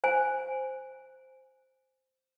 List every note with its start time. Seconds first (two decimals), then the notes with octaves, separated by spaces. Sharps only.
0.04 C5 G#5